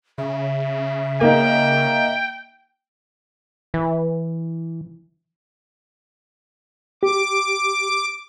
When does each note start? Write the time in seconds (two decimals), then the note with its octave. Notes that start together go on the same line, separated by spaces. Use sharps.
0.18 C#3 E5
1.21 A#3 D#4 G5
3.74 E3
7.03 G4 D6